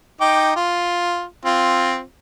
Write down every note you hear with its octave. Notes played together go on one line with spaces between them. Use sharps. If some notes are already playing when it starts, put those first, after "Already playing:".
D#4 G5 D6
F4
C4 F4